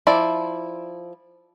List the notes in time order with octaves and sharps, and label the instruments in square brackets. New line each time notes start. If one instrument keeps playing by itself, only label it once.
[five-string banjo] F3 E4 D5